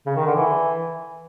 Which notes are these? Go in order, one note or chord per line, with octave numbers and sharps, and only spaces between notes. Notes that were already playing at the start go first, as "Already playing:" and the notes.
C#3
D#3
D3
E3